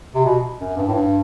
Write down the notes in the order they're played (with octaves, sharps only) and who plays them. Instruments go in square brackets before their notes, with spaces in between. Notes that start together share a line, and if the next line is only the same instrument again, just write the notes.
[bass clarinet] C3
B2
F#2
G2
A2
G2